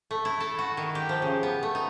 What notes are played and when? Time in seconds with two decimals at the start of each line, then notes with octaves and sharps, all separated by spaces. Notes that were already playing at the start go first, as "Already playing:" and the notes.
0.11 A3
0.25 E4
0.40 A4
0.59 F#4
0.77 D#3
0.95 G4
1.09 F3
1.22 C#3
1.43 B3
1.63 A3
1.75 D#4